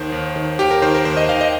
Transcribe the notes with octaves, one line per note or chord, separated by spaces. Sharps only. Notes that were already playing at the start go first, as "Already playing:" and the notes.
Already playing: D#2 D#3 C5
D#2
D#3
D#2 G4
A#4
D#3 C5
A#4
D#2 C5
D#5
D#3 F5
D#5